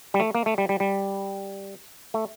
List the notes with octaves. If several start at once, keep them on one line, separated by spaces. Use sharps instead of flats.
G3
A3
A#3
A3
G3
G3
G3
A3